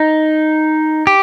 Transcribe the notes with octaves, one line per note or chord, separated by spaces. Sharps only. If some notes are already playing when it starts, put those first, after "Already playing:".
Already playing: D#4
G4